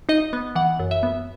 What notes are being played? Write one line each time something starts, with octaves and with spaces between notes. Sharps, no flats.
D#4 D#5
B3
E3 F#5
F#2
E5
B3